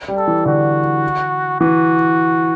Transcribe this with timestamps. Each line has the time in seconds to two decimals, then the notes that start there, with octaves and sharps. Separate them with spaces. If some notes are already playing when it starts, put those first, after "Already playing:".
0.08 G3
0.17 A4
0.28 E3
0.46 D3 F#4
1.61 E3 F#4